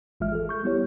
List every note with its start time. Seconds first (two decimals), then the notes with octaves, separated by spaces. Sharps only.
0.20 G#1 E3 G#3 F4 E5 F6
0.32 G#4 A4
0.49 C#6 G6
0.63 G3 B3 E4 G4 C#5